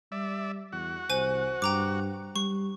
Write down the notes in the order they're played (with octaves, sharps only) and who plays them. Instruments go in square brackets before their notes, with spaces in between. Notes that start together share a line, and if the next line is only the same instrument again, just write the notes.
[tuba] G3 [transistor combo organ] D5 E5
[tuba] E2 [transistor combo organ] F#4
[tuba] C2 [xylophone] C5 G#5 D#7
[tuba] G2 [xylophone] G5 A#5 D6
[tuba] G3 [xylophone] C#6